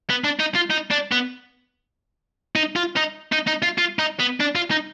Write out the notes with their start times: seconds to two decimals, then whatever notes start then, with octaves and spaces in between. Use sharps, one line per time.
0.10 B3
0.24 D4
0.40 D#4
0.55 F4
0.71 D#4
0.91 D4
1.12 B3
2.56 D#4
2.76 F4
2.96 D#4
3.32 D#4
3.47 D#4
3.63 F4
3.78 F4
3.99 D#4
4.19 B3
4.40 D4
4.55 F4
4.71 D#4